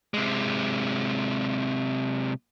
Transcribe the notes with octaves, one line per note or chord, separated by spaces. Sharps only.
C3 G#3